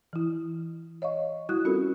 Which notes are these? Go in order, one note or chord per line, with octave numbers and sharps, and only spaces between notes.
E3 E4
C#5 D#5 F5 C#6
G3 E4 F#4 C#6 D#6 F#6
C4 C#4 F4 F#4 A4 A#4